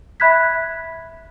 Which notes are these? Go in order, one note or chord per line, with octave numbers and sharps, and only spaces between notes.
E5 B5 F#6 G#6 B6